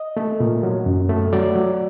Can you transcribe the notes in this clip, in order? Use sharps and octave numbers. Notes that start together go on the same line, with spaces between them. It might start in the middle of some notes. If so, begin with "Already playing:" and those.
Already playing: D#5
A3
A#2
F#3
F#2
A3
F#3 D5
F#3